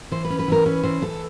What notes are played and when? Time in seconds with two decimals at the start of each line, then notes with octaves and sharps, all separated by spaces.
0.11 E3 C5
0.25 B4
0.30 C#4
0.39 B4
0.48 E3 A#4
0.66 C#4 B4
0.83 E3 C5
1.02 E3 A4